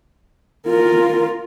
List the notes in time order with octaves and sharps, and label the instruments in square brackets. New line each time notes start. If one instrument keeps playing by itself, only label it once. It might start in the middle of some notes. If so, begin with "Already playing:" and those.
[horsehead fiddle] F4 A#4